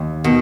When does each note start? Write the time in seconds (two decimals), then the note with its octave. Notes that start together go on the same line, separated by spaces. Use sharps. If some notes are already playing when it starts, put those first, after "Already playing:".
Already playing: D#2
0.24 B2 D#3